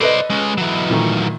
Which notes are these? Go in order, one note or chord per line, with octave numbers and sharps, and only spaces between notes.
A4 B4 C5 D5 D#5
G#3 C#4
E3 F#3
A#2 D#3 A3